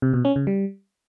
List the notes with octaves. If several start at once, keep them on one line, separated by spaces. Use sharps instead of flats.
C3
B2
C#4
C#3
G3